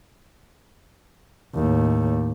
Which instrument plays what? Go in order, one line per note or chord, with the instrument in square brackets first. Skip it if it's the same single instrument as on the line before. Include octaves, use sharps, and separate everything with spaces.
[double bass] D#2 A2